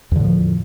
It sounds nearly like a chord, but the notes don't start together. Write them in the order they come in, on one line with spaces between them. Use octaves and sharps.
E2 D3 A2 F3